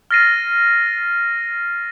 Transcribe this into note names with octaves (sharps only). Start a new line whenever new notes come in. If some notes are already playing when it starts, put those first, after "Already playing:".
F6 A6 A#6 C7 D#7